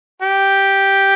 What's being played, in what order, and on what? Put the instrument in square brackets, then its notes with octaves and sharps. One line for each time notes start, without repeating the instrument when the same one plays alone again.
[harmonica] G4